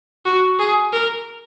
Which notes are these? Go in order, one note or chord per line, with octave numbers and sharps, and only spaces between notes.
F#4
G#4
A#4